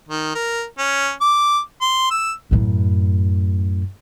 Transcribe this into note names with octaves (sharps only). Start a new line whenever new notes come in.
D#3
A#4
C#4
D6
C6
E6
F#2 A2